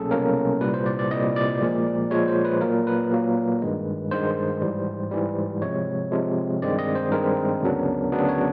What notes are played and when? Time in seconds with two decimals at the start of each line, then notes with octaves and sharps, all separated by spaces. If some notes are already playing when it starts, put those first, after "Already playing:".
Already playing: C2 B2 F#3 A#3 C#4 G#4 A4
0.11 C2 B2 F#3 A#3 C#4 A#4
0.61 C2 A#2 G3 B4
0.74 C5
0.86 D5
0.99 D5
1.11 C2 A#2 G3 D#5
1.36 D5
1.61 A#2 F3 G#3
2.11 A#2 F3 G#3 C#5
2.28 C5
2.45 B4
2.61 A#2 F#3 A#3 A#4
2.87 B4
3.12 A#2 F#3 A#3
3.62 G2 D#3 G#3
4.11 G2 D#3 G#3 C5
4.62 G#2 E3 G3
5.12 G#2 E3 G3
5.62 C3 F3 G#3 C#5
6.12 C3 F3 G#3
6.62 G2 D#3 G#3 C4 D5
6.79 D#5
6.95 C5
7.12 G2 D#3 G#3 C4 A#4
7.62 D2 C#3 F#3 B3 D4
8.12 D2 C#3 F#3 B3 D4
8.29 C#5